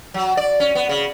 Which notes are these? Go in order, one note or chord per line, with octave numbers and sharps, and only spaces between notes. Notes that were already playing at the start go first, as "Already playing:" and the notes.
F#3
D5
C#4
B3
C#3